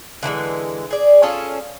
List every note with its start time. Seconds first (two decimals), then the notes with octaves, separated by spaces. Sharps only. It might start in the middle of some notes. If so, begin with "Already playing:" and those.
0.23 D3 E3 F#3 G#3
0.91 G#4 D5
1.23 C#4 F4 G#4 A4